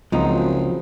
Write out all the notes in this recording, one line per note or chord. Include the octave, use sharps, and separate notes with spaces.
F#1 C#2 F3 F#3 C4 D#4 F#5